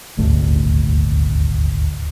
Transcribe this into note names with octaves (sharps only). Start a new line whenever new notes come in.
D#1 G#1 D2 A3